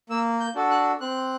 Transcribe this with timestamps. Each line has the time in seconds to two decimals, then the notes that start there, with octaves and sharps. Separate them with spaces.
0.10 A#3 E6
0.40 G6
0.55 D4 F#4 A4
0.71 F#6
1.01 C4 F#6